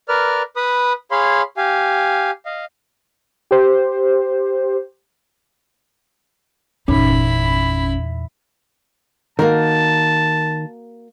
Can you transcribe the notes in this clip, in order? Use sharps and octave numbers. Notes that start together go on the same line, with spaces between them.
A#4 B4 D5 F6
B4 B5 D#6
G#4 C#5 F5 B5 C6
G4 F5 G#5
D#5 F5
G4 C5
G1 E2 A#2 C#4 D#4 E4 B5
D#3 A#3 F#4 A#4 A5